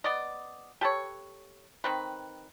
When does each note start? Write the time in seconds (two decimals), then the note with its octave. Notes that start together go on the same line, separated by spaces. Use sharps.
0.04 B3 D5 D#5
0.81 G4 A4 B4 C#5
1.84 D#3 C4 B4